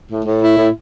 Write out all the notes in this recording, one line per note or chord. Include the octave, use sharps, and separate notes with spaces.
A2
A2
E4
A2